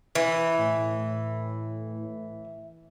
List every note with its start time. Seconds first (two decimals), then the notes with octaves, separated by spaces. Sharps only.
0.15 E3
0.58 A2